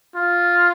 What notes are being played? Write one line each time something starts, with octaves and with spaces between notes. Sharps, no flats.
F4